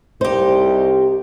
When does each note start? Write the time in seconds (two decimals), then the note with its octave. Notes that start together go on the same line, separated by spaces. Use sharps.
0.21 C2 D#4 G4 C5